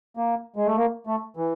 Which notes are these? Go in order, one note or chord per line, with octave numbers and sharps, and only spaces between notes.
A#3
G#3
A3
A#3
A3
E3